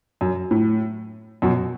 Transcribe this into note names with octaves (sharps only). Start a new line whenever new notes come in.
F#2
A2
F#2 B2